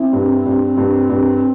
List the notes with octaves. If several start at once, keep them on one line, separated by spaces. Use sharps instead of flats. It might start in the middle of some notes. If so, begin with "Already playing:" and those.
Already playing: C4 E4
G2
G2
G2
G2